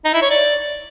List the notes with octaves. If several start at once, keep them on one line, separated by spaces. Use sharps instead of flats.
D#4
E4
C#5
D5